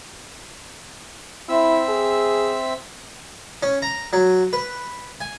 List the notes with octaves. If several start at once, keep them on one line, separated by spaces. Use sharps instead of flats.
C4 E4 E5 E6
G#4
C#4
A#5
F#3
B4
G#5